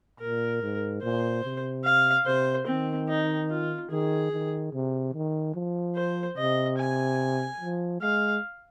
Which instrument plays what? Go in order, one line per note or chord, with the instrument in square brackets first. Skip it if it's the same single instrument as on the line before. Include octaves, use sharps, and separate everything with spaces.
[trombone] A#2 [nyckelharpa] A#4
[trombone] G#2
[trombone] A#2 [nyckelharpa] C5
[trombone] C3
[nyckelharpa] F5
[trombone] C3 [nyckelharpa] C5
[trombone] D#3 [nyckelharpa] C4
[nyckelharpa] D#4
F4
[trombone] D#3 [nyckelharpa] G#4
[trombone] D#3
C3
D#3
F3
[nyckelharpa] C5
[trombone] C3 [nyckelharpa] D#5
[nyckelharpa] G#5
[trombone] F3
[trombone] G#3 [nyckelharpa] F5